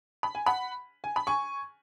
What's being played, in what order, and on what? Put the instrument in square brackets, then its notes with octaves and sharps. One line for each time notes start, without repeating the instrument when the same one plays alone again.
[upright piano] B5
G#5
F#5 B5
G#5
B5
G#5 C#6